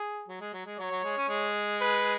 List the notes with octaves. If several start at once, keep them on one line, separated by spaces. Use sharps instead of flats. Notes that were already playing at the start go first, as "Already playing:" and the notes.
Already playing: G#4
F#3
G#3
F#3
G#3
F#3 C#5
F#3
G#3
C#4
G#3
B4